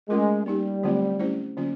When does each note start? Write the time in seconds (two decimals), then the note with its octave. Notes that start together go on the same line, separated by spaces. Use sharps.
0.09 G#3 A3 C#4 F4 A#4
0.46 G3 A#3 D#4 G4
0.83 D3 F#3 A3 C4 F4
1.19 A3 C#4 E4 G4 C5
1.57 D3 F#3 A#3 C#4 F4